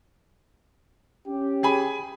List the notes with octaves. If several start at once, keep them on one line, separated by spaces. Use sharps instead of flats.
C#4 G4
G#4 G#5 B5